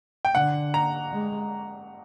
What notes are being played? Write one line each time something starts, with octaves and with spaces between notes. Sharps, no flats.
G5
D3 F#5
A#5
G#3